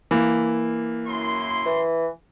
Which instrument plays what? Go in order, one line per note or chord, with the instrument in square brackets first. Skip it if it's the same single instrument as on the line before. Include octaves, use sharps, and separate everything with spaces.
[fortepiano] E3 [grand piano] A#3
[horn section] F#2 E4 C6
[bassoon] E3